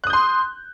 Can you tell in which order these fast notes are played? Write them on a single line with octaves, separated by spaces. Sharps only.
F#6 D#6 G6 C6